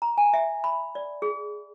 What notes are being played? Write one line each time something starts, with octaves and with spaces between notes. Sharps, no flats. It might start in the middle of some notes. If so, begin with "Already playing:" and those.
A#5
G#5
E5
B5
D5
G#4